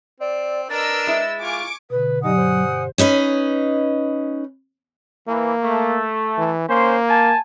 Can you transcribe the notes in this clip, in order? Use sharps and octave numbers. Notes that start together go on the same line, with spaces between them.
C4 D5
D4 A#4 B4 D#5 E6 A6
G#3 E4
F4 G#5 C#6 D6
B2 D3 B4
G2 F#3 D#4 G4 D5 F#5 G#5 D#6
C5
C#4 D#4 B4 D#5
E3 A#3
A3
E3
A#3 C#4 C5
G#5 A5